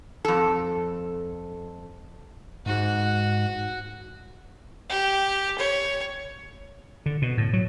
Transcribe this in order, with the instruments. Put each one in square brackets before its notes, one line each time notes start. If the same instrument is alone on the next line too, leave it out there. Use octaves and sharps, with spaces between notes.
[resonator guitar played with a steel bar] F2 A4
[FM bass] G#2 [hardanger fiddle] F#4
[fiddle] G4
C#5
[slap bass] D3
B2
A2
F#3